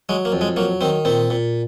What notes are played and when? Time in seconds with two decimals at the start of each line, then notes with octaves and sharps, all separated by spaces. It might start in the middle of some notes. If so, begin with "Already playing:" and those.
0.09 F#3 G#3
0.25 A#3
0.32 F2
0.41 G#3
0.56 F#3 A#3
0.81 D#3 C4
1.05 A#2 C4
1.30 A#2